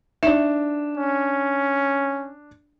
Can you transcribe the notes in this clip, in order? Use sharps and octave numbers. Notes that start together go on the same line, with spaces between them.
D4 D#4 E5 E7
C#4